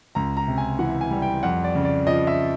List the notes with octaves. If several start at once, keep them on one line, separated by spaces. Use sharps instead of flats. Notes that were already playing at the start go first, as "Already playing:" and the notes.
C#2 A#5
A#5
C3
G#5
E3 F#5
G#5
G3
G5
F2 F#5
D5
C#3
D5
F3 D#5
E5